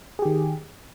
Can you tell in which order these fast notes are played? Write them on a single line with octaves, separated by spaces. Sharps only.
G#4 G4 D#3